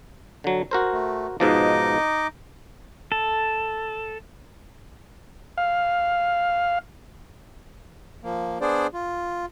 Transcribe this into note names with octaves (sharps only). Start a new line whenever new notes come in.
D3 F#3
F#4 A#4 C5
A3
G#2 B2 F3 D#4 D#5 D6
A4
F5
F3 A#3
B3 D4 G#4 C5 D5
F4